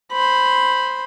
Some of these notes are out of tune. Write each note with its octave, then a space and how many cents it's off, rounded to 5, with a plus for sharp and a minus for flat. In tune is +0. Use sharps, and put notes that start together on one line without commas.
C5 +0 B5 +0